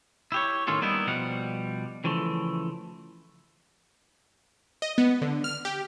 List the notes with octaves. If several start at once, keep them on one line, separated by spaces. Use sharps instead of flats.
E4 G4 C#5
A2 D#3 C#4 F4 A4
G3 A#3 B3 D#4 E4
B2 F3 G3 F5 F#5
C#3 E3 F3 A3
D#5
B3
D3
F6
G4